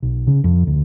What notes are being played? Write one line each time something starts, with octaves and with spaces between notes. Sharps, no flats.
B1
C#3
F2
D2